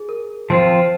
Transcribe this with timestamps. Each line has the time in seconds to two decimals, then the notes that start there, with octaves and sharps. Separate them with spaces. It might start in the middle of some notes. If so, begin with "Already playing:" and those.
Already playing: G#4
0.09 A#4
0.50 F3 C4 F4 C5